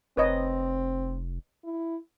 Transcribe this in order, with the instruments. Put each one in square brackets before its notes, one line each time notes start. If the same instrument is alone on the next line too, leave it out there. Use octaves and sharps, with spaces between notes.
[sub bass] F1 [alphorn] C4 [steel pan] B4 C#5 D#5
[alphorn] E4